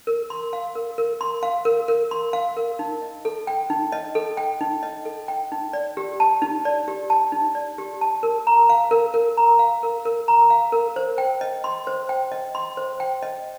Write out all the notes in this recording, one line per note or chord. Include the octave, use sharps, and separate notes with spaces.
A#4
C6
F5
A#4
A#4
C6
F5
A#4
A#4
C6
F5
A#4
D#4
D#5
A4
G5
D#4
D#5
A4
G5
D#4
D#5
A4
G5
D#4
D5
G4
A5
D#4
D5
G4
A5
D#4
D5
G4
A5
A#4
A#5
F5
A#4
A#4
A#5
F5
A#4
A#4
A#5
F5
A#4
C5
G5
D#5
C6
C5
G5
D#5
C6
C5
G5
D#5